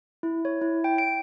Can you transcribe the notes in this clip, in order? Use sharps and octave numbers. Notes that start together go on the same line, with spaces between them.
E4
C#5
E4
G5
D7